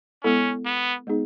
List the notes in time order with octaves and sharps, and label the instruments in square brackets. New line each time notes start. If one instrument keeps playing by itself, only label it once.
[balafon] G#3 B3 E4 A4 [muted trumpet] C#4
[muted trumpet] B3
[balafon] G#3 B3 D#4 G#4